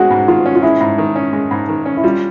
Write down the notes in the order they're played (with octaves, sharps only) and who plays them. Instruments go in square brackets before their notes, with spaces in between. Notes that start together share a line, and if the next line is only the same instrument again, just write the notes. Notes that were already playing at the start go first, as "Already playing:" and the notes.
Already playing: [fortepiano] D#3 G#3 C#4 [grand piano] F#4 G#4
[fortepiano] G#2
[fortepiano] D#3 [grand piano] F4
[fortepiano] C#4
[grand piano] F4
[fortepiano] G#3 [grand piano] E4
[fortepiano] G#2
D#3
C#4
G#3
G#2
D#3
C#4
[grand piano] E4
[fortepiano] G3 [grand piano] F4